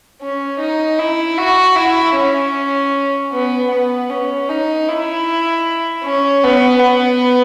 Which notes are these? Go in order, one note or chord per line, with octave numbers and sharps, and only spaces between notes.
C#4
D#4
E4
F#4
E4
C#4
B3
B3
C#4
D#4
E4
C#4
B3
B3